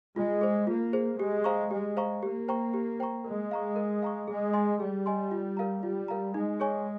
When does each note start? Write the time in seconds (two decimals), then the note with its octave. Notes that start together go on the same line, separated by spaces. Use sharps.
0.16 G#3 F4
0.41 G#4 C5
0.67 A#3 F4
0.93 G#4 C5
1.18 G#3 G4
1.44 C5 F5 A#5 C#6
1.71 G#3 G4
1.97 C5 F5 A#5 C#6
2.22 A#3 G4
2.48 C5 G5 A#5 C#6
2.74 G4
3.00 C5 G5 A#5 C#6
3.24 G#3 A#4
3.51 F5 A#5 C#6
3.76 A#4
4.03 F5 A#5 C#6
4.28 G#3 G#4
4.53 D#5 G#5 C6
4.80 G3 G#4
5.06 D#5 G#5 C6
5.31 F4
5.57 A#4 F5 A#5
5.82 G3 F4
6.08 A#4 F5 A#5
6.34 G#3 D#4
6.60 G#4 C#5 G#5 C#6